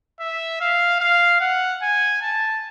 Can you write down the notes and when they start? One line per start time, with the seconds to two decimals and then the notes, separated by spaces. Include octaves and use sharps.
0.20 E5
0.60 F5
1.01 F5
1.41 F#5
1.82 G#5
2.22 A5